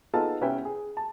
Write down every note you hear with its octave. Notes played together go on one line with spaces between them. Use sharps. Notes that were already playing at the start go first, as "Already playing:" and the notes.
B3 D#4 F4 G#4 A4 A5
C2 B3 C#4 B4 E5 G5
G#4
A5